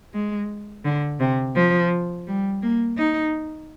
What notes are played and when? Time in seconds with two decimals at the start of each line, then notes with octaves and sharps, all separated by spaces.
0.14 G#3
0.85 D3
1.20 C3
1.55 F3
2.27 G3
2.62 A#3
2.98 D#4